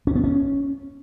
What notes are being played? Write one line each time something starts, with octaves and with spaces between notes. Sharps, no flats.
C#4
B3
C#4